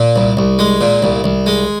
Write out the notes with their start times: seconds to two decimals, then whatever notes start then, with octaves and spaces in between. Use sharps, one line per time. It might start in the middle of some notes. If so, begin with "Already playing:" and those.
Already playing: A#2
0.16 C2
0.37 C2
0.59 G#3
0.81 A#2
1.03 C2
1.24 C2
1.46 G#3